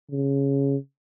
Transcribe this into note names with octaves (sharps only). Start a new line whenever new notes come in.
C#3